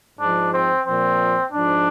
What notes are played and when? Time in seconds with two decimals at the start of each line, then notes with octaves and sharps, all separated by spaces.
0.19 G#2 F3 D4
0.53 C4
0.85 A#2 F3 C4
1.52 G#2 F3 D4